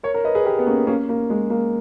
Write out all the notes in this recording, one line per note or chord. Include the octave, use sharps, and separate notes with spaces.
A#4 C#5
A#4 C#5
B4 D#5
G#4 B4
G4 A#4
B3
A#3 C#4
A#3 C#4
A#3
G#3
A#3